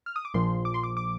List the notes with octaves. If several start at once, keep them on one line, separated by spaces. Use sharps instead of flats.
F6
D#6
D6
A#1 A#2 F3 C6
D6
C6
D6
D6